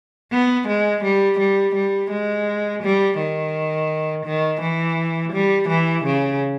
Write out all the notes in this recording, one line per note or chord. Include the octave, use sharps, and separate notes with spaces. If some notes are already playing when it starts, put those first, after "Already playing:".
B3
G#3
G3
G3
G3
G#3
G3
D#3
D#3
E3
G3
E3
C#3